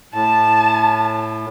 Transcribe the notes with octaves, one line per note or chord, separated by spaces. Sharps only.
A2 A5